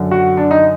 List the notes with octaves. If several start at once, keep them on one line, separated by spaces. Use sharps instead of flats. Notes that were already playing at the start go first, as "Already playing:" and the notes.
Already playing: F#2 D3
F#4
D4
D#4